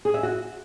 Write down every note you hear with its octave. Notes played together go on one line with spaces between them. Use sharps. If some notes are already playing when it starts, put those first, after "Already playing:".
G#4
E5
F#4